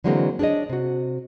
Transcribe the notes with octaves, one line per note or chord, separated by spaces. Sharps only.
D3 E3 F#3 G#3 A#3 C4
D4 G#4 B4 C#5 D#5
C3 F#4